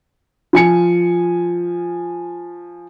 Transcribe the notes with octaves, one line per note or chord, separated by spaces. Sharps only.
F3 G#5 C#7